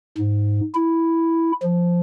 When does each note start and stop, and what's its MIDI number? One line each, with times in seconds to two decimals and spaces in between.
0.18 0.60 44
0.74 1.51 64
1.62 2.00 53